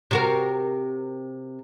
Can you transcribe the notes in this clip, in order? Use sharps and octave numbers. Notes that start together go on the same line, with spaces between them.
C3 F#4 A#4